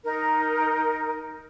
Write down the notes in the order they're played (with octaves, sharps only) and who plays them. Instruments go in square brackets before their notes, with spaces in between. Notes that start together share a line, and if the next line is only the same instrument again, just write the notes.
[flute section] D#4 A#4